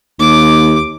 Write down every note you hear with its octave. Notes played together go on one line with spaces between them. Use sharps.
D#2 D6